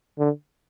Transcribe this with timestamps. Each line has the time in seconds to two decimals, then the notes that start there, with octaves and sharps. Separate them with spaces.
0.19 D3